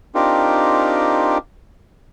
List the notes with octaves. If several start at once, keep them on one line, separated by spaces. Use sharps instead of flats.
C4 D4 D#4 F4 G4 A#4